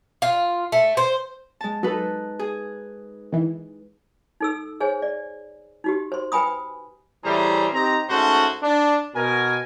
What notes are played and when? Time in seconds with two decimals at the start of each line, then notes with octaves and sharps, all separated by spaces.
0.22 F4
0.72 A3
0.97 C5
1.61 G#3 A5
1.83 F#3 D#4 A4 B4
2.39 G#4
3.32 D#3 E3
4.41 D#4 A4 E6
4.80 G#4 C5 C#5 G#5
5.02 D5
5.84 D#4 F#4 G4
6.12 C5 C6
6.32 B4 G5 G#5 B5 D#6
7.24 A2 E3 G3 G#4 C5 A#5
7.73 C4 D#4 G4 A#5
8.09 G#2 A3 C#4 F#4 C5 A5
8.62 D4
9.15 B2 A#4 G#5